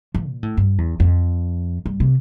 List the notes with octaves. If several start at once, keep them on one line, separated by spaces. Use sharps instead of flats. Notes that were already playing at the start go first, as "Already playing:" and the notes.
F3
A#2
A2
G2
E2
F2
G2
C3